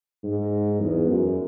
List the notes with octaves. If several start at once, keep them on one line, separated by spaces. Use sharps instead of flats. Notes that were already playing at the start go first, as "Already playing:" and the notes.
G#2
E2
F#2